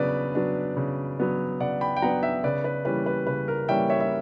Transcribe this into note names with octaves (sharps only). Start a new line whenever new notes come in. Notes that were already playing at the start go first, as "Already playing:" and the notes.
Already playing: C#3 F#3 B3 D4 B4 D5
F#3 B3 D4
C#3
F#3 B3 D4
C#3 D5 F#5
G5 B5
G5
F#3 B3 D4 F#5 A#5
E5 G5
C#3 B4 D5
B4 D5
E3 G3 A#3 C#4 B4
B4
C#3 B4
A#4
E3 G3 A#3 C#4 E5 G5
C#5 E5
E5